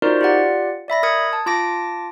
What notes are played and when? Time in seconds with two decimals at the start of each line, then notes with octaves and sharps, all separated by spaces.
0.02 D#4 F4 F#4 A#4 C5 D5
0.21 F4 G4 D5 F#5
0.88 D5 E5 B5 A#6
1.03 A#4 D#6 G#6 C#7
1.33 A5
1.46 F4 A5 D6 A#6 D7